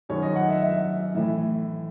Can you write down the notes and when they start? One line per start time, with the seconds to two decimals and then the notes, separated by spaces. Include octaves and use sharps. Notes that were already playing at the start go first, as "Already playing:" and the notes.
0.09 F#2 D#3 F#3 C#5
0.22 D#5
0.36 F#5
0.49 E5
0.62 E5
1.15 A2 E3 E5